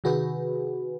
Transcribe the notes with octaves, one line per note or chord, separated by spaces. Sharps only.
C3 D#3 F#4 G#4 B4